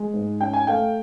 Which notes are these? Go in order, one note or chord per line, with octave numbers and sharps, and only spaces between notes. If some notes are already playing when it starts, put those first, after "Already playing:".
Already playing: G#3
G#2
C#4 G5
G#5
A3 F5 G5